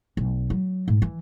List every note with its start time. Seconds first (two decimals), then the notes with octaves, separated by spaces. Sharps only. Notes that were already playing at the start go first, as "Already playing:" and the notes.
0.17 B1
0.50 F#3
0.88 G#2
1.02 E3